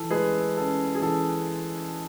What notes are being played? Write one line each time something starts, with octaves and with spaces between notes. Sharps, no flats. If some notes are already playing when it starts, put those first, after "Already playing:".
Already playing: E3 A4
G#3 G#4 B4
C#4 A4
G#4
E3 A4